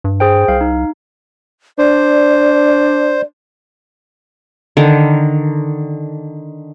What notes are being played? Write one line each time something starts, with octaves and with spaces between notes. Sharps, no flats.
G2
G#4 C5 G5
C2 F5
D#4
D4 C5 D5
D3 D#3 A#4